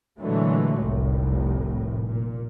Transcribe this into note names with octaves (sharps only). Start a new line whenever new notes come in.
A#2 D3 E3 F#3 G#3 A3
F1 C2 A2
A#2